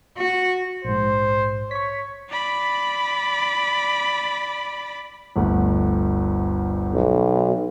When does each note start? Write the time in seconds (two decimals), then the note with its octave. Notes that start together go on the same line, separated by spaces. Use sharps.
0.17 F#4
0.85 A#1 G#2 C5
1.71 C#5 C#6 B6
2.30 D5 B5
5.36 G1 D2
6.93 B1